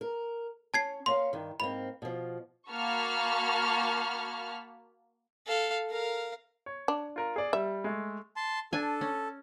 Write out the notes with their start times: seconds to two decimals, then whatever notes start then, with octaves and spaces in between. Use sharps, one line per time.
0.01 A#4
0.74 C#4 A5 G#6 C7
1.06 A#3 C#4 F5 C6
1.33 G2 D#3
1.60 G#2 A#3 C4 B5
2.02 B2 F3
2.71 A#3 F#4 A5 B5 C#6 F6
5.47 A4 F5
5.90 A#4 F5
6.66 C#5
6.88 D4
7.16 F4 A#4
7.36 G#4 D5
7.53 G3 E5
7.84 G#3 A3
8.36 A5 C6
8.73 D4 A4 G#5
9.01 C#4